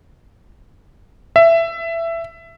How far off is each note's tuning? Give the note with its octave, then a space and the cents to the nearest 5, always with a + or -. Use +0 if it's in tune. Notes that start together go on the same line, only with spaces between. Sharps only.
E5 +15